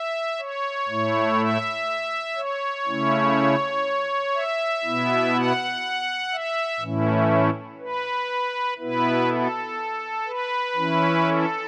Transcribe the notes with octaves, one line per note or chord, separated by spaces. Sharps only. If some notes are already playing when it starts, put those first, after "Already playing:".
Already playing: E5
C#5
A2 A3 E4
E5
C#5
C#3 A3 C#4 E4
E5
B2 B3 E4
F#5
E5
A2 E3 A3 C#4 E4
B4
B2 B3 E4 B4
A4
B4
E3 C#4 E4
A4